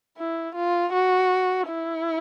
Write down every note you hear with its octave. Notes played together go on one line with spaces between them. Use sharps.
E4
F4
F#4
E4